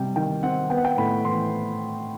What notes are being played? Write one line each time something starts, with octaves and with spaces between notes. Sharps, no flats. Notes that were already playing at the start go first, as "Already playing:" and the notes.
Already playing: C3 G3 G5
D#3 G5
C4 F#5
B3 G5
F#5
G5
A2 B5
E3 C6